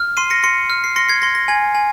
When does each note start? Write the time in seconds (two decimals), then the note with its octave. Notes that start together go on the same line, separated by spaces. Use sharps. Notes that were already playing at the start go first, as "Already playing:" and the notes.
Already playing: F6
0.17 C6 C7 D#7
0.30 A#6 C#7
0.43 C6 A#6 C#7
0.70 F6
0.84 C7
0.96 C6 A#6 C#7
1.09 G#6 C7
1.22 C6 A#6
1.35 A#6
1.48 G#5 G#6
1.75 G#5